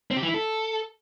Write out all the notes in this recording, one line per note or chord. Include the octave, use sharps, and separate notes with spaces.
C4
G4
E3
E4
A4